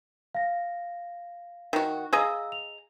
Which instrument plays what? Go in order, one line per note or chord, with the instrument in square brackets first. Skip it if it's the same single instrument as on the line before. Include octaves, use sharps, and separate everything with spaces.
[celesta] F5 A#6
[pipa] D#3 F#4
[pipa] G#4 D#5 A#5 [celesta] F5 E6
[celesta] F7